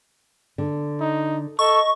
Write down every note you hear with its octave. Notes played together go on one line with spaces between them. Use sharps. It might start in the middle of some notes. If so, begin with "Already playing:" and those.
D3
D#4
A4 D#5 C#6